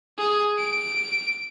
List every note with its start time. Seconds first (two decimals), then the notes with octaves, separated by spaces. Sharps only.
0.18 G#4
0.58 D7